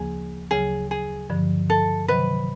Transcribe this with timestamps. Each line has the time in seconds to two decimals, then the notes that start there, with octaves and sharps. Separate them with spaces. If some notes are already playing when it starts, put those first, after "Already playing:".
Already playing: D2 C#3 F3 A#3 G#4
0.51 D2 C#3 F#3 G#4
0.91 G#4
1.30 G2 D3 F3
1.70 A4
2.08 C3 D#3 F#3 B4